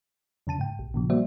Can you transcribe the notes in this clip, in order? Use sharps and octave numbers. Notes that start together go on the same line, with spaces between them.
F2 C#3 A5 D#7
G#2 G5
A#1
A#2 C#3 F3
G3 A#3 F#4 C5 D5 E5